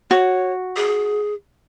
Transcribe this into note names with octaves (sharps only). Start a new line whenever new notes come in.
F#4 C#5
G#4